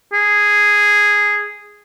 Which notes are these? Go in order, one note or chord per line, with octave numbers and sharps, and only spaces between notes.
G#4